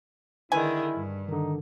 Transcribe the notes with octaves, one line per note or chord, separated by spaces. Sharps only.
D3 D#3 G#3 E4 B4 G#5
G2
D3 D#3 D#4